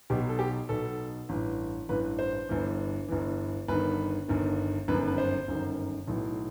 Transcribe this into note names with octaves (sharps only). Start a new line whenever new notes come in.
B1 B2 G4
A4
G4
B1 B2 A4
A1 G2 E3
A1 G2 E3 B4
C5
G1 G2 E3
G1 G2 E3
G1 G2 D#3 B4
G1 G2 D#3
G1 F#2 D#3 B4
B4
C5
G1 F#2 D#3
B1 A2 E3